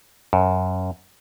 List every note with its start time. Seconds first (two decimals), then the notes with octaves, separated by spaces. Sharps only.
0.33 F#2